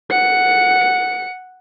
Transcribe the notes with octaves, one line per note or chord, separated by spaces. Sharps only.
F#5 C#7